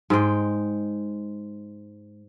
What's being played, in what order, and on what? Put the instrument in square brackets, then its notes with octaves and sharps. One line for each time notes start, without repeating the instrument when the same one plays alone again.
[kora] G#2 G#3 G5